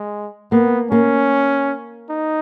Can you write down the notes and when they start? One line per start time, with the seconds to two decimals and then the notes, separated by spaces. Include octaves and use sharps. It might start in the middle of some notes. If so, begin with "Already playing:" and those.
Already playing: G#3
0.52 A#3 B3
0.91 A#3 C#4
2.10 D#4